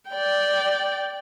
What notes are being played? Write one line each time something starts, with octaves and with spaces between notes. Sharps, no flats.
D5 G5